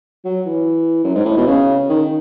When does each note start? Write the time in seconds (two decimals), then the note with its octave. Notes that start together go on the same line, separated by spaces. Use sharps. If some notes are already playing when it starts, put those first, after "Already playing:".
0.25 F#3
0.46 E3
1.04 F#2
1.15 G#2
1.25 A2
1.37 B2
1.47 C#3
1.89 D#3